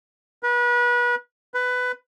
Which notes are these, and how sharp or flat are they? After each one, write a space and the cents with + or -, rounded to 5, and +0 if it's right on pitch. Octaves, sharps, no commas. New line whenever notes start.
B4 -30
B4 +15